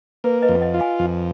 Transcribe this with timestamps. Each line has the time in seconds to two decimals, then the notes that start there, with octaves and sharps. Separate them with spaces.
0.24 A#3 B4
0.42 B4 D#5
0.49 F2
0.55 F5
0.61 D#5 F#5
0.74 F4
0.80 F5 G#5
0.99 F2